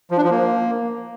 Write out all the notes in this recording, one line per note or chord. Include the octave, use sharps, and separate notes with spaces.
F3
D4
F3
A#3